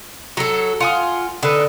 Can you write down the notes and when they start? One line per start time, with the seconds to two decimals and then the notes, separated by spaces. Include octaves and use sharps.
0.37 F#3 A4 A#5
0.80 F4 F#5 G#5 D#6
1.43 D3 D#4 A4 B4